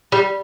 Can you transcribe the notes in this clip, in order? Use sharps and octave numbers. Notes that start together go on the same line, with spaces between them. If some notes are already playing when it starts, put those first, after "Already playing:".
G3